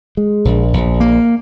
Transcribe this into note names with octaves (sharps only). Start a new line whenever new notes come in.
G#3
A#1
A#1
A#3